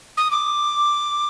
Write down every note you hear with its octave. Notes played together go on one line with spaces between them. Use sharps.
D#6
D6